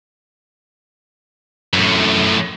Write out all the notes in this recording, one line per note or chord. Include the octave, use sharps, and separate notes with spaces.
F#2 A2